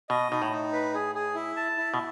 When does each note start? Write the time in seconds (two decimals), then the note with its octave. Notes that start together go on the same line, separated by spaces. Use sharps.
0.09 B2 D#5
0.31 B2 D#4
0.42 A2
0.52 D#4
0.72 B4
0.94 G#4
1.15 G#4
1.35 E4
1.57 A5
1.78 E4
1.94 B2